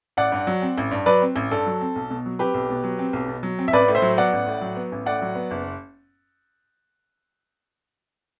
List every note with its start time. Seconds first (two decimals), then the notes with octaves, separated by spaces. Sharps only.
0.17 A1 D5 F#5
0.32 G2
0.47 F#3
0.62 C4
0.78 A1
0.91 G2
1.06 F#3 B4 D5
1.22 C4
1.36 A1
1.51 G2 A4
1.66 F#3
1.81 C4
1.96 B1
2.10 B2
2.26 F#3
2.39 C4 G4 B4
2.54 B1
2.70 B2
2.84 F#3
2.99 C4
3.13 B1
3.28 B2
3.43 F#3
3.59 C4
3.68 E5
3.73 A1 B4 D5
3.88 A2
3.95 C5 E5
4.02 F#3
4.18 B3 D5 F#5
4.33 A1
4.47 A2
4.61 F#3
4.76 B3
4.92 A1
5.06 A2 D5 F#5
5.22 F#3
5.35 B3
5.51 F#1